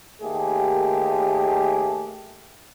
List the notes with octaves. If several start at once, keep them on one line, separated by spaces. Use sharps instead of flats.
D#2 A3 G4 G#4